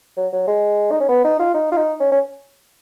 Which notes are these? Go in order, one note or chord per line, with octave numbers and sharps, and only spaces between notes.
F#3
F#3
G#3
D#4
C#4
B3
D#4
F4
D#4
F4
D#4
C#4
C#4